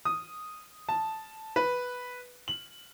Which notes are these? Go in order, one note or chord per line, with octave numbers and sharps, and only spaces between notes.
D#6
A5
B4
F#7